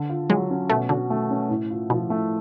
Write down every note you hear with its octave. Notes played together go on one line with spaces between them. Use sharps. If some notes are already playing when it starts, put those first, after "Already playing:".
Already playing: D3
F4
F#3 G#3
C#4
B2 A3
D3 F#4
A3
C#4
A2
F4
B2 F3
A3